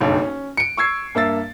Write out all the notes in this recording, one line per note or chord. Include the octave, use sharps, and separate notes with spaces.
F#1 B1 G2
C#4
C#7 D7
C#6 E6 G#6 C7
G2 A#3 E5 E6 A6